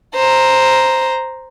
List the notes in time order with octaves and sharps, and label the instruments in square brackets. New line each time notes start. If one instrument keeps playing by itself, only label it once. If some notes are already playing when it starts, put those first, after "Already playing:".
[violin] C5 A#5